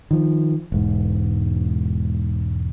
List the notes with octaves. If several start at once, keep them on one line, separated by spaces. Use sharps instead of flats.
D#3 F3
E1 G#2